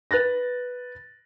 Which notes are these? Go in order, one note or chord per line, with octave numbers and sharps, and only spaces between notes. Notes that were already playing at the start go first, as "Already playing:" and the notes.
B4 F#6 A6 A#6